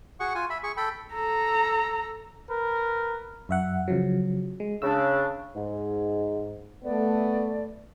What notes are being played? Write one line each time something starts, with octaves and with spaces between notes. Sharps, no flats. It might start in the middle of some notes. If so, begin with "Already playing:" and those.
F#4 G#4 F#5 C#6
F4 G#5
E5 B5
G#4 C#6
A4 G5 B5
A4 A#5
A#4 B4
F#2 E5 F#5
C#3 F3 F#3
G#3
C#3 D4 E6
G#2
A3 B3 D5